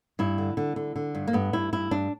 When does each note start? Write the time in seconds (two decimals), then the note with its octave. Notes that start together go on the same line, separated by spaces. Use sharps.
0.19 G2 E4
0.38 D3
0.57 D3
0.76 D3
0.96 D3
1.15 G2
1.27 A#3
1.33 G2 B3
1.53 G2 E4
1.73 G2 E4
1.91 G2 D4